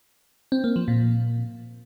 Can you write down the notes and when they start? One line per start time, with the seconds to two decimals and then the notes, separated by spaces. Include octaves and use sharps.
0.52 C4
0.64 A#3
0.76 F3
0.88 A#2